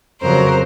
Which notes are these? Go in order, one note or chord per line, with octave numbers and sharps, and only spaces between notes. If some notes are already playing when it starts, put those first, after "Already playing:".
F2 C#3 F#3 A#4 C5